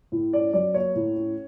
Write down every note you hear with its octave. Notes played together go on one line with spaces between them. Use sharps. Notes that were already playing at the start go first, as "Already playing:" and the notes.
A2
C#4 D5
F#3 D5
A#3 C#5
A2
C#4